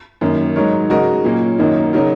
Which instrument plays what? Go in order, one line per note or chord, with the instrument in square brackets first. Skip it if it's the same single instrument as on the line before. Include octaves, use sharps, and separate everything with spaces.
[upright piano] F#2 D#3 A#3
G#2 F#3 D#4 A#4 C#5
C#3 G#3 F#4 A#4 D#5
A#2 F#3 A#3 C#4
F#2 D#3 F#3 A#3 D#4
C#3 F#3 D#4 A#4